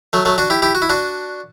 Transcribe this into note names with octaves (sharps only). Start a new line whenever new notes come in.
F#3 A3
F#3 A3
D4 F#4
E4 G4
E4 G4
F#4
E4
D4 F#4